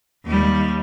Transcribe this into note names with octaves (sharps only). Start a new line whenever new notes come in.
D#2 G3